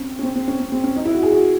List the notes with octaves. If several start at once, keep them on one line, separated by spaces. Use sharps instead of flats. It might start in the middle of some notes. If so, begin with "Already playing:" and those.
Already playing: C4 C#4
C#4
C4
C4
C#4
C4
C4
C#4
D#4
E4
F#4
G#4
F#4